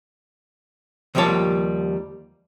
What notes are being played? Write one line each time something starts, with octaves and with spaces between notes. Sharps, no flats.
D#2 F3 G3 A#3 C#5 A5